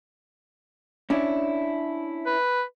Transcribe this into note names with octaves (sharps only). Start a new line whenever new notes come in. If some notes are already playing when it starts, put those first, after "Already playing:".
C#4 D4 E4
B4